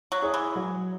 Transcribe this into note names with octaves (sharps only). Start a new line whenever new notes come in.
F#3
E4 G#4 C#5
E3
F#3